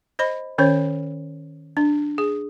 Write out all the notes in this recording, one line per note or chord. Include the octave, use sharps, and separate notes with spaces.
C5 D#5 B5
D#3 C#4 C5 C#5
D4
G#4